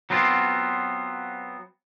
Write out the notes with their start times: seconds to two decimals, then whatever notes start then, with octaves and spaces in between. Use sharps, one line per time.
0.10 F#3 B3 C4 F4